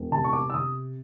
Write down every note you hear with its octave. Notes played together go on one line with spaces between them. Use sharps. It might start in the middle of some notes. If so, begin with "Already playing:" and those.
Already playing: E1
C3 A5
C#6
D6
E6
C3 D#6